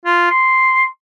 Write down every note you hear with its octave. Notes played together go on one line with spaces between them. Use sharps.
F4
C6